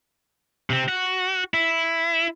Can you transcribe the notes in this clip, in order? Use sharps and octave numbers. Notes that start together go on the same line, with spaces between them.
C3 C4
F#4
E4